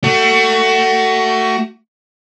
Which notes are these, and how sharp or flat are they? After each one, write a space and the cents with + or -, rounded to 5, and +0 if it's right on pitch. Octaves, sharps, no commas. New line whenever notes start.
A3 +25 F#4 +25